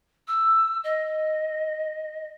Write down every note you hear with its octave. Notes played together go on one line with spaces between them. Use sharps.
E6
D#5